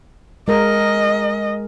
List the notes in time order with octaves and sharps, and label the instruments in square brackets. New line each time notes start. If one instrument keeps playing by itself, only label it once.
[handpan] G#3 A#4 [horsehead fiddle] D#5